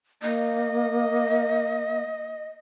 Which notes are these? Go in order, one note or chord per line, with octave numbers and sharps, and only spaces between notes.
A#3 D#5